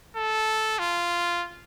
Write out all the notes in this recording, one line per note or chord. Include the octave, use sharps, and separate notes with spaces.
A4
F4